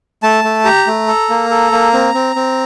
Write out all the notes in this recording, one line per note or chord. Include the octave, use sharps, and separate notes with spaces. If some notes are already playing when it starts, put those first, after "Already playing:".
A3 A5
A3
G4 A#5
A3
A4
A#3
A4
A#3
C4
C4
C4